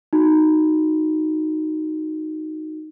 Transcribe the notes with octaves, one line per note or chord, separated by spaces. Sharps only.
D#4 F#4